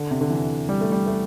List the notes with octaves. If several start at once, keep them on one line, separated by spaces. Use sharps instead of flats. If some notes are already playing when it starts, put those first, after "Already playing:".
Already playing: D3
C3
D3
E3
G3
A3
G3
A3